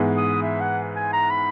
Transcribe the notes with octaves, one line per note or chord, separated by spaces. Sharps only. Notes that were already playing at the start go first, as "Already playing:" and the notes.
Already playing: G#2 E3 G#3 B3
D#6
E5
F#5
G#5
A#5
B5